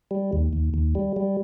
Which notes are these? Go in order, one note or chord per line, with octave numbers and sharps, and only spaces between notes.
G3
D#2
D#2
D#2
G3
G3